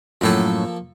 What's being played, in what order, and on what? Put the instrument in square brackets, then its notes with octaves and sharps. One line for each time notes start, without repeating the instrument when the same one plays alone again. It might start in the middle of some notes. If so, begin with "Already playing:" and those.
[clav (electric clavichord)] F#2 A2 F#3 [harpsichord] F3 A#3 A4